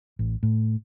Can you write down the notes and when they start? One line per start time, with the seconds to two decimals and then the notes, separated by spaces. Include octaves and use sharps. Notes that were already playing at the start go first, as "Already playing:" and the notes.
0.19 A1
0.43 A2